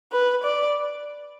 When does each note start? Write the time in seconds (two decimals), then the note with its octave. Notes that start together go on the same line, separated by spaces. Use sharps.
0.13 B4
0.44 D5